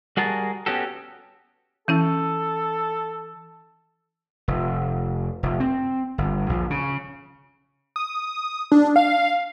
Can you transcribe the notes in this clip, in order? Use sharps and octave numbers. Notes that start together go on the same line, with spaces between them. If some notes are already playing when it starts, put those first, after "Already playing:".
G3 F#4 G#4 A#4 A5
B3 C#4 F#4 G4 A4
E3 C#4 E4 A4
F1
F1
C4
G1
A#1
C#3
D#6
D4
F5